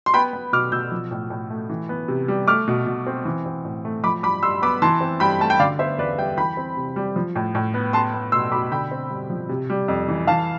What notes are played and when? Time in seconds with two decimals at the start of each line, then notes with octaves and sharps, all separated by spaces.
0.06 C6
0.14 B3 G5 B5
0.33 B3
0.53 B2 D6 F6
0.72 B2 E6 G6
0.92 F3
1.11 A2
1.30 A2
1.50 A3
1.69 E3
1.89 B3
2.08 C3
2.28 G3
2.47 A3 D6 F6
2.68 B2
2.87 B2
3.07 C4
3.25 E3
3.46 C4
3.65 A2
3.85 A3
4.04 F3 B5 D6
4.23 G2 B5 D6
4.43 G2 C6 E6
4.62 B3 B5 D6
4.82 E3 A5 C6
5.01 C4
5.20 G2 G5 B5
5.40 A3 A5
5.50 G5
5.60 D3 D5 F5
5.79 B3 C5 E5
5.98 E2 B4 D5
6.18 G3 E5 G5
6.37 E3 G5 B5
6.57 C4
6.77 C3
6.96 G3
7.16 F3
7.36 A2
7.55 A2
7.74 B3
7.93 B3 A5 C6
8.14 B3
8.32 B2 C6 E6
8.52 B2 B5 D6
8.71 D3 G5 B5
8.91 C4
9.10 G2
9.30 F3
9.49 C3
9.70 G3
9.88 F2
10.08 E3
10.27 E3 F5 A5